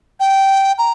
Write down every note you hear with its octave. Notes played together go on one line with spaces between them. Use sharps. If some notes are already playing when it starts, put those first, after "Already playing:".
G5
A#5